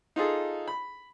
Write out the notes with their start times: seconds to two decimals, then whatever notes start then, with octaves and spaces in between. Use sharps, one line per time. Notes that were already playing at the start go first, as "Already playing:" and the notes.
0.16 D#4 F4 G#4 A4
0.68 B5